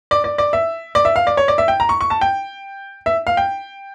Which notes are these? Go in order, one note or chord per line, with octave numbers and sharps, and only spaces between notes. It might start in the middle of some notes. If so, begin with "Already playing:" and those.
D5
D5
D5
E5
D5
E5
F5
D5
C#5
D5
E5
G5
A#5
C#6
C#6
A5
G5
E5
F5
G5